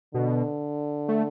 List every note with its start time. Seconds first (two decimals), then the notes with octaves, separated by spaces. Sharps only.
0.14 B2 D3
1.08 A3